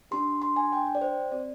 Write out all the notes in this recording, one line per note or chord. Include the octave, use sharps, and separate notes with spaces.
D4 G4 C6
C6
G#5
G5
G5
D5
C5
C4 G4 D5